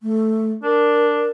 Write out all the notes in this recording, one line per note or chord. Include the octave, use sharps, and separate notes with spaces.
A3
D4 A#4